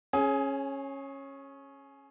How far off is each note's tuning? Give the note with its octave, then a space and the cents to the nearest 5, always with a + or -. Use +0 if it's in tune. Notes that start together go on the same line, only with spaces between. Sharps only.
C#4 -15 G#4 +20